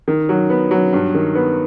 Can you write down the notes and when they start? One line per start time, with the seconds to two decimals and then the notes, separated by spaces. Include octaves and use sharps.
0.08 D#3
0.29 F#3
0.50 B3
0.71 F#3
0.93 G2
1.14 D#3
1.35 B3